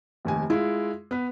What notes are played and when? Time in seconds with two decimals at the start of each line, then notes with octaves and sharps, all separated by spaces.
0.25 F1 D#2 G#5
0.50 G#3 E4 F4
1.11 B3 B4